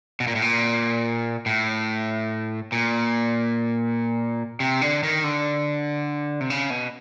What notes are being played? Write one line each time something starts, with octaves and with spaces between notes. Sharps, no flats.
B2
A#2
A2
A#2
A2
A#2
C3
D3
D#3
D3
C3
C#3
B2